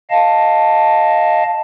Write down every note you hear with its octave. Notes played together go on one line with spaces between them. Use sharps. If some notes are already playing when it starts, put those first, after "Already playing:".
D#5 F5 A5